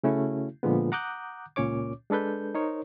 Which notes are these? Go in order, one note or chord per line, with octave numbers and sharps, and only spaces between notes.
C#3 A3 C#4 E4 F#4
A#2 D3 F3 G#3 B3
F#5 A#5 D6 D#6 F#6 G6
C#2 A#2 C#4 C#5 D6
G#3 D4 A4 B4 G6
D#4 A#4 C5 C#5